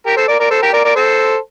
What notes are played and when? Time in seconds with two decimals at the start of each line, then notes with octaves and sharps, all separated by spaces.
0.06 G4 A#4
0.17 A4 C5
0.28 A#4 D5
0.39 A#4 D5
0.50 A4 C5
0.62 G4 A#4
0.73 A#4 D5
0.84 A#4 D5
0.95 A4 C5